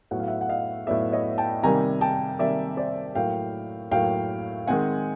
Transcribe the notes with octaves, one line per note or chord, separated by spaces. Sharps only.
A2 F#3 B3 F#5
F5
E5 F#5
F#5
D#5 F5
A2 F#3 B3 D5 E5
C#5 D#5
G5 A5
C3 D#3 G3 A#3 G#5 A#5
G5 A5
C3 D#3 G3 A#3 D5 E5
C5 D5
A2 F#3 A#3 F5 G5
A2 F#3 A#3 F5 G5
D#3 G#3 C4 F#5 G#5